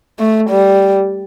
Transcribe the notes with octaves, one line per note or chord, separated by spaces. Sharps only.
A3
G3